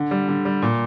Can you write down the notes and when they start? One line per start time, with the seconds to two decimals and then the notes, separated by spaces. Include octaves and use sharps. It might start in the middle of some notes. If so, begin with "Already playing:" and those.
Already playing: D3
0.11 G3
0.28 D3
0.45 G3
0.62 A#2